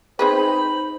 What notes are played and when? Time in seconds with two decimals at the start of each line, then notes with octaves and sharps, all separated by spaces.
0.19 C4 D#4 G#4 B4 C5 B5